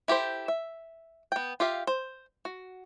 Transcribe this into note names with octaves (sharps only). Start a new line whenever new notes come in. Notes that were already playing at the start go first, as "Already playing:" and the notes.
E4 G4 A4 C5
E5
B3 G5
F4 G4 E5 F5
C5
F#4